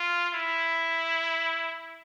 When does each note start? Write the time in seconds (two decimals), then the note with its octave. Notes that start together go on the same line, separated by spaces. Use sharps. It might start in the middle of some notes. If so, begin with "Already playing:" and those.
Already playing: F4
0.34 E4